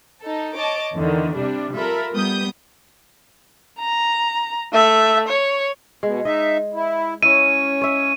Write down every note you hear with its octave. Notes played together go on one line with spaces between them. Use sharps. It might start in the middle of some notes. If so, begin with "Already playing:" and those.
D#4 A4
C#5 D#5 A5 D6
E2 D3 D#3
C3 G3 D4
F4 A4 A#4 E5 B5
G3 B3 D#6 G6
A#5
A3 E5
C#5
B2 G#3
D#4 D#5 E5
E4
C#4 E4 C#5 D#7
C#5 E5